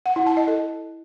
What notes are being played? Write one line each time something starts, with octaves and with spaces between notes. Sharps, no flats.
F#5
E4
A5
D#5
A4